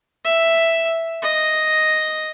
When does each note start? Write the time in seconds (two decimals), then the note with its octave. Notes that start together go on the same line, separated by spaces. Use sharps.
0.25 E5
1.22 D#5